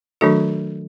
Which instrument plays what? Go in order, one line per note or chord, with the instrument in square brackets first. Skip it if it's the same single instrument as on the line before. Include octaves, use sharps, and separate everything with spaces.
[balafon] D#3 F#3 A3 D4 F#4 A4